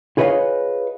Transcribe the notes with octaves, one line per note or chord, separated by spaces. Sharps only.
F4 G#4 B4 C#5 D#5 F5